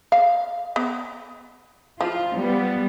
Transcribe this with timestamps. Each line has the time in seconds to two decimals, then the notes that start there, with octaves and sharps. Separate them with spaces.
0.12 F5
0.76 B3
2.01 F3 F4
2.36 G3 B3